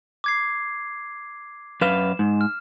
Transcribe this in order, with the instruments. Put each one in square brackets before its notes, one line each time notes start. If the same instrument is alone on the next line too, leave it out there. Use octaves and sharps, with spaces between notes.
[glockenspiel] D6 G#6 C7
[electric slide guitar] F#2 B4 F5 [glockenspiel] E7
[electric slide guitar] G#2
[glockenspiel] F6